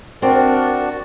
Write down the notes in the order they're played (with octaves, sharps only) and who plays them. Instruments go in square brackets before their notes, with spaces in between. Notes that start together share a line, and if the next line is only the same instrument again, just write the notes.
[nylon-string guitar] C4 [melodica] D4 F#4 D5 [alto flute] A#4